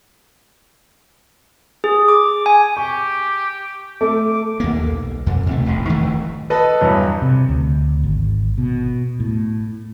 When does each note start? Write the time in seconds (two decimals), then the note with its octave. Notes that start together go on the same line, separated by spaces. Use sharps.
1.84 G#4
2.08 D6
2.46 G#5
2.77 G4 C#6
4.01 A3 D6
4.60 D#2 A#3
4.90 B1
5.26 F2
5.47 D#2 C3 A3
5.66 E1 A1
5.89 D1 D#3 E3 A3
6.50 A4 B4 D#5 A5 B5
6.81 E2 G2 F#3
7.22 C3
7.49 D2
8.03 G#1
8.58 B2
9.20 A2